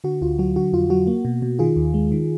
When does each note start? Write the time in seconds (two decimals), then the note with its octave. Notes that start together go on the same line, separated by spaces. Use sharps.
0.04 D3 F#4
0.22 D2 F4
0.39 F#3 F#4
0.56 D3 F#4
0.73 F2 F4
0.90 F#3 F#4
1.07 A#3
1.25 B2
1.42 B2
1.59 D#3 F4 G#4
1.76 D#2
1.94 G#3
2.12 D#3